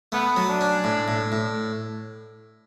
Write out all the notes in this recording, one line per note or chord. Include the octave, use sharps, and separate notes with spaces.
A3 B3
F#3
D4
C#4
A2
A2
A2